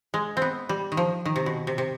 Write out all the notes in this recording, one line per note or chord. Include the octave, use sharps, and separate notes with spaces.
G#3
C4
B3
G3
D#3
F3
D#3
C3
B2
C3
C3